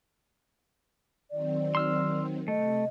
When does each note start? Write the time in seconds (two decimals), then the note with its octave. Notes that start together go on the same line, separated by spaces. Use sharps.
1.31 D#3 F#3 C4 D5
1.75 C6 E6 F6
2.48 C3 A3 D#5